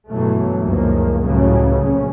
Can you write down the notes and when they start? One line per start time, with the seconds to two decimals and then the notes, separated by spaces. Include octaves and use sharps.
0.10 G2 B2 E3 F#3 A3
0.61 C#2 F#2 A#2 D#3 F3 A#3
1.22 C#2 A2 C#3 F#3 G3
1.82 A#1 C#4